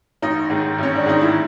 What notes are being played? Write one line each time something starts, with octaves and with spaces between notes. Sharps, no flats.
A1 D#4
G#2 D#3
A1 C#4
D4
G#2 D#3 D#4
E4